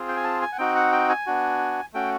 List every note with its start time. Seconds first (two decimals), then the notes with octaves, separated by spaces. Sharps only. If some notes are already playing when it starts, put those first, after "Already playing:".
Already playing: C4 F4 G#4
0.08 G5
0.17 G#5
0.24 A5
0.42 G#5
0.52 F#5
0.58 C4 D#4 F#4 G5
0.76 F#5
0.92 G5
1.09 G#5
1.27 B3 D4 F#4
1.94 A3 C#4 F#4 G5